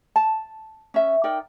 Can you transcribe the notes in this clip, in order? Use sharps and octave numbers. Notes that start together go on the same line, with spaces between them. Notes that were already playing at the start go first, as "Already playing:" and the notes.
A5
C#4 E5
D#4 A#4 D5 G5